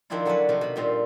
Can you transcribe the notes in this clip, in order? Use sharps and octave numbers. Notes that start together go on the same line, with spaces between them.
D#3 F3 C4 D4 E4 F4
D3 F#3 C#4 D4 B4
C3 D#3 F3 F4 F#4
B2 B5
G2 A#2 C4 F4